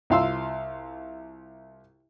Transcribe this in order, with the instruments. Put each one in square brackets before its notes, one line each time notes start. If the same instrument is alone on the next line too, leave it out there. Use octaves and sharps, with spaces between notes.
[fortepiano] C2 F4 F5 C6 E6